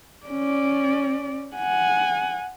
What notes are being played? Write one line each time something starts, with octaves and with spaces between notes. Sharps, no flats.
C#4 D5
F#5 G#5